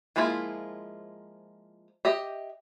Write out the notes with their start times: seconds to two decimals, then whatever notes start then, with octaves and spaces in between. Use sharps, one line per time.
0.16 F3 G#3 A#3 E4 F4
2.05 G4 D#5 E5